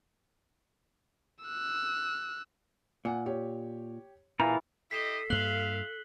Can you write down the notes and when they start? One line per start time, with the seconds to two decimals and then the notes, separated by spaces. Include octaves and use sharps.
1.44 E6 F#6
3.05 A#2 F#5 G#5
3.26 G4 C#5
4.39 A#2 E3 F4 A#5
4.91 E4 G4 A4 D#5 B6 C7 E7
5.30 G2 A#3 F4 E5 F5 F#6 F#7 G7